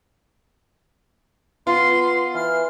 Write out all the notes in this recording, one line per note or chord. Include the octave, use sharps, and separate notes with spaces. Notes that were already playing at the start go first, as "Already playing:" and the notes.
B3 F4 C6
E3 F6